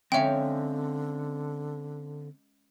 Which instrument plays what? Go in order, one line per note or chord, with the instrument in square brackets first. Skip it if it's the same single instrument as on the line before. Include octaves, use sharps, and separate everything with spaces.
[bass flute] D3 [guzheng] G#3 C#4 C#5 [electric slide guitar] C4 F5 [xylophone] E5 G5